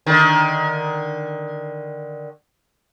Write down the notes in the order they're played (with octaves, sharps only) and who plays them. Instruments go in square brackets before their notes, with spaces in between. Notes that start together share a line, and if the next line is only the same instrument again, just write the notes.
[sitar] D3 D#3